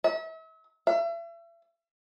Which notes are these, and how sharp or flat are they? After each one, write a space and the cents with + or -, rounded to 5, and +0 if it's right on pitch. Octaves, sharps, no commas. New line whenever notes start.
E5 -40
E5 +35